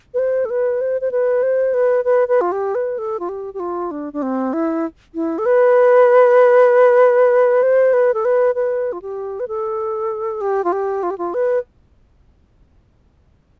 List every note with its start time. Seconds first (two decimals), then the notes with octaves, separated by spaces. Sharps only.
0.14 B4
0.19 C5
0.45 A4
0.50 B4
0.81 C5
1.01 C5
1.11 B4
1.43 C5
1.74 B4
2.05 B4
2.28 B4
2.41 F4
2.52 G4
2.75 B4
2.98 A4
3.20 F4
3.29 G4
3.54 G4
3.60 F4
3.91 D4
4.13 D4
4.22 C4
4.53 E4
5.15 E4
5.38 A4
5.46 B4
7.63 C5
7.93 B4
8.14 A4
8.25 B4
8.55 B4
8.93 F4
9.02 G4
9.40 B4
9.48 A4
10.41 G4
10.64 F4
10.72 G4
11.03 F4
11.10 G4
11.18 F4
11.34 B4